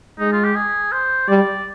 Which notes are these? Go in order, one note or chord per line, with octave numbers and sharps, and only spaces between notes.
G#3 D#4
F4
G4
G#4
C5
G3 D5